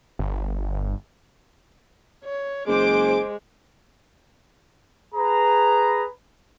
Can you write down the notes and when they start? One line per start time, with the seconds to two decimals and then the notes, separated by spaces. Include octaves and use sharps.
0.19 G1
2.25 C#5
2.68 F#1 G#3 G#4 C5 D6 D7
5.14 G#4 B4 A#5